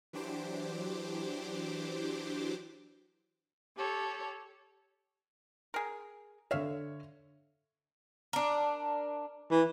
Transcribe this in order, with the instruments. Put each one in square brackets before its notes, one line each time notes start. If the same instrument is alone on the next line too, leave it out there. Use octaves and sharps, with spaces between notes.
[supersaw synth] E3 F#3 D4 G4 C5 D6
[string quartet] G4 A4 C#5
[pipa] G#4 A#4
[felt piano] D3 C#5 [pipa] E5 F5
[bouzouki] D4 A#4
[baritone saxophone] E3